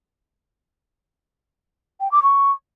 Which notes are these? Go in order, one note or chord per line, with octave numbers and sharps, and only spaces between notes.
G5
D6
C#6